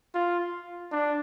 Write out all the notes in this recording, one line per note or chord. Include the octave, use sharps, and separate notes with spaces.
F4
D4